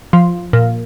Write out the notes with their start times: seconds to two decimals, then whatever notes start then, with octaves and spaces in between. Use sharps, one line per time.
0.13 F3
0.53 A#2